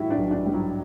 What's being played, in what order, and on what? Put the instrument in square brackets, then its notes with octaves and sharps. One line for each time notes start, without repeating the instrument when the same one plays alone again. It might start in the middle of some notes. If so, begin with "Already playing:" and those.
Already playing: [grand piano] A2 E3 G3 [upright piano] E4 F#4
[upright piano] D4
[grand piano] B1
[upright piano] D4
[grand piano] G3
[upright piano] F#3